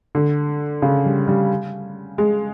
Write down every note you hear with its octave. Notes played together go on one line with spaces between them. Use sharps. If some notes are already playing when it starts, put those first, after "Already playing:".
D3
C#3
G3
G3
G#3